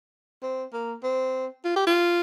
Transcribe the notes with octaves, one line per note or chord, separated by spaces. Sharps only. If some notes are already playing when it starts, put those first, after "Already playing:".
C4
A#3
C4
F4
G4
F4